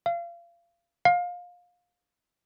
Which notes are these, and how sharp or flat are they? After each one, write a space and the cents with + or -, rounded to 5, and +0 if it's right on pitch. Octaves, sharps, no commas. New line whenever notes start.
F5 -30
F5 +25